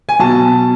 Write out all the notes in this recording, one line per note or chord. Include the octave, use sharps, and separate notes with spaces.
G#5
B2 F#3 A5